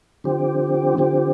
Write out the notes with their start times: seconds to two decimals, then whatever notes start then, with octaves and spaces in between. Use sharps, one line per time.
0.24 D3 F3 C4 G4
0.97 D3 F3 C4 G4